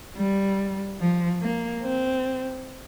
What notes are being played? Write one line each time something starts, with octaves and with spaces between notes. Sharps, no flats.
G3
F3
A#3
C4